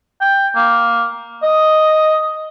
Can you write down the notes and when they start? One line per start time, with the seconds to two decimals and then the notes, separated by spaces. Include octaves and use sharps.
0.21 G5
0.56 A#3
1.42 D#5